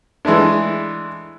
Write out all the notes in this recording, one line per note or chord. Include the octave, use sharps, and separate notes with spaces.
E3 G#3 A3 D4